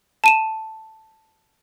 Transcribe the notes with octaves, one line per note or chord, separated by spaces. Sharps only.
A5 D#7 E7